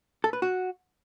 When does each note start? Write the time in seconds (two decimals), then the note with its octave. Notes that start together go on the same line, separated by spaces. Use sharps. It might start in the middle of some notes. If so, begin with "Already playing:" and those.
0.24 A4
0.33 B4
0.42 F#4